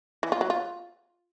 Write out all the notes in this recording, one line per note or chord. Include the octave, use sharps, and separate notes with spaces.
E3
F4
F#3
F4